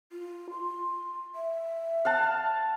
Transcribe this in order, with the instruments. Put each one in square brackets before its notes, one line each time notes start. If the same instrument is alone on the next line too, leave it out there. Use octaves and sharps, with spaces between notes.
[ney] F4
C6
E5
[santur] F5 F#5 A5